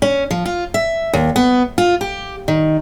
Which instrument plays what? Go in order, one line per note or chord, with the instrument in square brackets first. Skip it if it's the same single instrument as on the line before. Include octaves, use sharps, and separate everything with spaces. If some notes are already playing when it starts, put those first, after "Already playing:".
[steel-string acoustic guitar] C#4
F3
F4
E5
D#2
B3
F4
G4
D#3